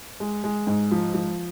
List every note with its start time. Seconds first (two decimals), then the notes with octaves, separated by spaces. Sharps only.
0.20 G#3
0.44 G#3
0.67 G#2
0.91 F3
1.14 F3